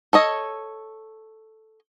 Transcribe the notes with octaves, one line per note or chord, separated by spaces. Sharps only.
A4 C#5 D#5